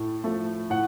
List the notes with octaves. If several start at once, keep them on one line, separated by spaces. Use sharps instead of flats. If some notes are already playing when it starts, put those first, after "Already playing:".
Already playing: A2 A3
F3 A3
A2 F#5